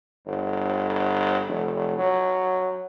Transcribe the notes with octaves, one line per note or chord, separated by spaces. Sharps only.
G1
F1
F#3